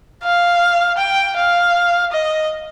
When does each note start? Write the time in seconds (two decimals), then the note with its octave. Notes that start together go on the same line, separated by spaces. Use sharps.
0.24 F5
0.98 G5
1.36 F5
2.12 D#5